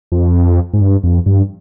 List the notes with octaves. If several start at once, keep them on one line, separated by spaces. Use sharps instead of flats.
F2
G#2
G2
F2
G2